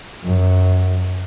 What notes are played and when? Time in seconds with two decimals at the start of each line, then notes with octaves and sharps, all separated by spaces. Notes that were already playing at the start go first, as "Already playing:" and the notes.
0.24 F#2